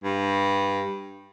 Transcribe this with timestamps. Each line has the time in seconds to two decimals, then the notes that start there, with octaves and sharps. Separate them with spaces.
0.04 G2